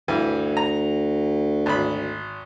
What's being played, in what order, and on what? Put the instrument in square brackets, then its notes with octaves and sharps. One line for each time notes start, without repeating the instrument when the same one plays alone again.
[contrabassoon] D2 [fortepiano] G2 E3
[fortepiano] A#5
G#1 B5